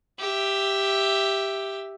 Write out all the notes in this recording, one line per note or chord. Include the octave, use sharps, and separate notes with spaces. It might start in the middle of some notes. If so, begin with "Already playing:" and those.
G4 E5